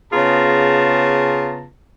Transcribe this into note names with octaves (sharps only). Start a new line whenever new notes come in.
C#3 B3 F4 G#4 A5 A#5